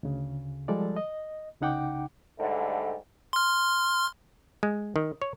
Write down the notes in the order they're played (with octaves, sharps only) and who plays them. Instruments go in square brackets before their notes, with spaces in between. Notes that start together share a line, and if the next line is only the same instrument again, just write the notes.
[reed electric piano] D2 C#3
F3 G3 G#3 A4 D5
D#5
C2 C#3 D#4 F#5 G5 D6
[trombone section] G#2 D3 G3 A3
[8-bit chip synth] C6 F6
[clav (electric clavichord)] G#3
D#3
C#5